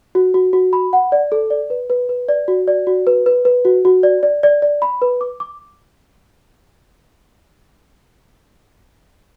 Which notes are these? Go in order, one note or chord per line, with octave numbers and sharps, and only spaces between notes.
F#4
F#4
F#4
B5
F#5
D5
A4
D5
B4
B4
B4
D5
F#4
D5
F#4
B4
B4
B4
F#4
F#4
D5
D5
D5
D5
B5
B4
D6
D6